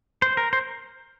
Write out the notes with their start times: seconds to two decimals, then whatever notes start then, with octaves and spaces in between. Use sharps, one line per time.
0.22 C5
0.37 A#4
0.53 C5